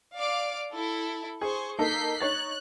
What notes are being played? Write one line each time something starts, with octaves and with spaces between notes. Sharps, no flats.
D5 F5 D6
E4 A4
G#4 C5 C#6
A#3 D#4 A4 G6 B6 C7
D#4 C#5 F#6 A6